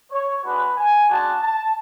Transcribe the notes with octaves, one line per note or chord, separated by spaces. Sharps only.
C#5
G#3 D4 F#4 B4
G#5
G#3 D4 F#4 A5
A5